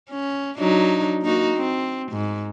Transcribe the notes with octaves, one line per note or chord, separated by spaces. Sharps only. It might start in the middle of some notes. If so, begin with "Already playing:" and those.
C#4
F#3 D4 D#4
A#3 D#4 F#4
C4
G#2